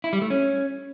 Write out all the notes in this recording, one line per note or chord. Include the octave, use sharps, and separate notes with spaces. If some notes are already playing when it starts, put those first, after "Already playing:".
E4
G3
A3
C#4